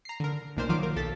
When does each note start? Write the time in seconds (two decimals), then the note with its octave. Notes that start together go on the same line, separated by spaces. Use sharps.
0.05 A#5 C7
0.20 D3 A#4
0.57 B1 A#2 A#3 D4 C5 F5
0.69 D#3 F3 F#3 F4 F5 D6
0.83 A#4
0.96 B1 A4 A6 B6